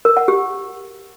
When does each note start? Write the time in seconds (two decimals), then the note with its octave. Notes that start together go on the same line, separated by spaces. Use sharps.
0.05 A#4
0.17 F#5
0.28 G4